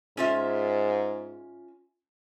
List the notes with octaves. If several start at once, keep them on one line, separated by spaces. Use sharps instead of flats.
G#2 C#4 F4 E5